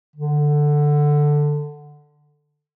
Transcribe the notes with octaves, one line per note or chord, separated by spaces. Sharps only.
D3